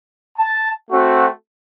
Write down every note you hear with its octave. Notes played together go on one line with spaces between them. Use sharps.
A5
A3 C4 F#4